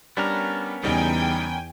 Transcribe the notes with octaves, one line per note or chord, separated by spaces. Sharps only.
G3 B3 C#4 D4 A#4
E2 C#3 G3 D#4 G5 G#5